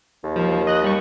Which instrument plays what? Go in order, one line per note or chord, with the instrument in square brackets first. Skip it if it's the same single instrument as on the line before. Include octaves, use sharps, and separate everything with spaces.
[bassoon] D#2
[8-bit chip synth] F3
D#5 F#6
G3 C#6